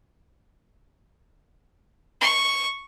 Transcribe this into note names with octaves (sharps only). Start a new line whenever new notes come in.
C#6